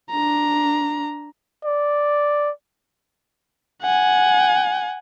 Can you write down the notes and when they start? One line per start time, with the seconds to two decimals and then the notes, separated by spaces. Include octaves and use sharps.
0.11 D4 A#5
1.65 D5
3.82 F#5 G#5